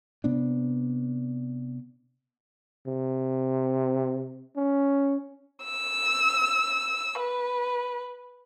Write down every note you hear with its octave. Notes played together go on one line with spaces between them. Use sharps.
C3 B3 D4
C3
C#4
E6
B4